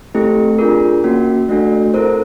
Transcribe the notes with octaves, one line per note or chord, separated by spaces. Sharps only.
A3 C4 E4 G4 A4
D4 F4 G#4 A#4
A#3 C#4 F#4
A3 D4 F#4 A4
C4 E4 A4 A#4 C5